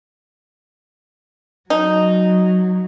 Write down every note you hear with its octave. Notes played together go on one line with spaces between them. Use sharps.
F#3 D#4